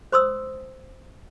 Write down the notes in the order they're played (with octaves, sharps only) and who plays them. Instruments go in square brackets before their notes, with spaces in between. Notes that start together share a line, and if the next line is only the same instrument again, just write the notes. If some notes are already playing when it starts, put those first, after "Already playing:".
[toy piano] C5 C6 D#6 E6